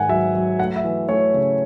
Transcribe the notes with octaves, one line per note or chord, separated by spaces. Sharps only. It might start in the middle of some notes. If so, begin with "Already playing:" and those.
Already playing: G#2 D#3 F#5 G#5
F#3 E5
F#3
A3 F#5
E5
E3
A3 C#5
C#3